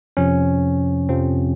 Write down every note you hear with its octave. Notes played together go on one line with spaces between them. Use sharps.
F2 C3 F3 C#4
F2 C3 F3 C4